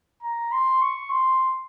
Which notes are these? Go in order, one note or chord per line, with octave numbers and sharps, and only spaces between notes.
A#5
C6
C#6
C6